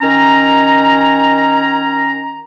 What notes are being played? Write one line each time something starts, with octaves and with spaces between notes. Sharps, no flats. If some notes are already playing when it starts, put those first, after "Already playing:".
D#3 C#4 A#5